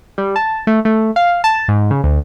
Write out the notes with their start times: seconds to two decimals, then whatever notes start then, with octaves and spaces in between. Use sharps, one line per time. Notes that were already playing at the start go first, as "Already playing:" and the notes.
0.18 G3
0.36 A5
0.67 A3
0.85 A3
1.16 F5
1.44 A5
1.68 G#2
1.91 C#3
2.04 D2